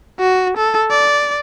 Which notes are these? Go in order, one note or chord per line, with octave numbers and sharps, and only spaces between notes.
F#4
A4
D5